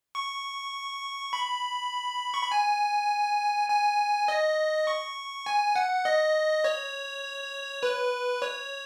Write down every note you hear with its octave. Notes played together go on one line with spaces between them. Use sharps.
C#6
B5
C#6
B5
G#5
G#5
D#5
C#6
G#5
F#5
D#5
C#5
B4
C#5